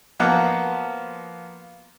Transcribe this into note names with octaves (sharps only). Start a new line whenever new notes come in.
F3 A#3 B3 F#4